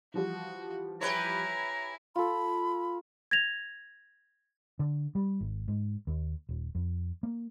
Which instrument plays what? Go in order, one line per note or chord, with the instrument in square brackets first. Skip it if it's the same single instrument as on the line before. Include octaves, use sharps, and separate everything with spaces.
[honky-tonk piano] E3 F3 G3 [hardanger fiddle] F#4
[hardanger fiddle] E4 G#5 [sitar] G4 B4 C#5 [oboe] A#5
[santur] F4 A4 [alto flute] B5
[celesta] G#6 A#6 F7
[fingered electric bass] D3
G3
G#1
G#2
D#2
D#1
F2
A#3